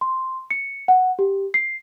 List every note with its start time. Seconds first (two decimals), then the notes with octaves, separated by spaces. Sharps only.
0.01 C6
0.50 C#7
0.88 F#5
1.19 G4
1.54 C7